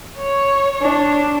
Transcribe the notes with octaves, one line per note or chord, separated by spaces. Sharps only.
C#5
D4